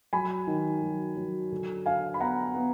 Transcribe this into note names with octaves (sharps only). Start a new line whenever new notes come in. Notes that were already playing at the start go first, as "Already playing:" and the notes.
F#3 G#5 B5
D#3
F#3
F#3
D3
D4 F5 G#5
B5
B3 F#5 A#5
B3